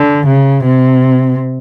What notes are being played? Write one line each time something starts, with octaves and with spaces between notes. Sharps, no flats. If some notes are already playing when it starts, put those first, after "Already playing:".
Already playing: D3
C#3
C3